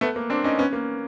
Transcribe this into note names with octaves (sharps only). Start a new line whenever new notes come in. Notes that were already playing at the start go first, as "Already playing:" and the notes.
A3 B3
A#3
C4 D4
C#4 D#4
B3 C#4
A#3